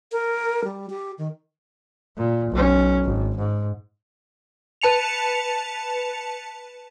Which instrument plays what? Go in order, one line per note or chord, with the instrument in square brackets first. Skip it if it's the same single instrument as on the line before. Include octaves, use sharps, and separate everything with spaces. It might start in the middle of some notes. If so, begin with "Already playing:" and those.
[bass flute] A#4
G3
G4
D#3
[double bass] A#2
B1 C#4
G#1
G#2
[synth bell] B4 A5 C#7 F7